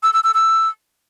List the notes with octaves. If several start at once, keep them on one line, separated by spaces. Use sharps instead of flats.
E6
E6
E6
E6